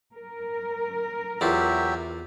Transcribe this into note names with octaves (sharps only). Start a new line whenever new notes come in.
A#4
E2 F#3 E4 F4 G4 E5